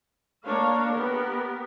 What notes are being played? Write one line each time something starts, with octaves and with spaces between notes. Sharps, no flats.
A#3 D4 C#5 F5
B3 G4 A#4